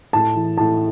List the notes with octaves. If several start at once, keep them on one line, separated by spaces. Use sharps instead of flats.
A2 A5
E3
A2 A5